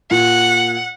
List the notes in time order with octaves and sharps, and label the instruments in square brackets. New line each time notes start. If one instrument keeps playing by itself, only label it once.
[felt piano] A#2 [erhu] F#5